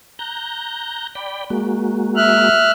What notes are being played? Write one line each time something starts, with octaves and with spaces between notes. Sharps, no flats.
A#5 F#6 G6
D5 G5 B5
G#3 A#3 F#4
E5 F6 F#6